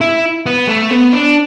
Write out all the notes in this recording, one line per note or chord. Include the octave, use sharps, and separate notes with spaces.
E4
B3
A3
B3
D4